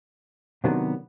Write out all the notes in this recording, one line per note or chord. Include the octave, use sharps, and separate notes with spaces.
C3 D#3 F#3 B3 D4